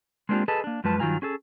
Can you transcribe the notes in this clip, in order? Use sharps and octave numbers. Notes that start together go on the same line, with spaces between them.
G#3 A#3 C4 D4 F4 G4
G#4 A4 B4 D#5 A5
A#3 D4
F#2 F3 G#3 B4 A5
G2 D#3 F#3 F4 G#5 A#5
C#4 G#4 A4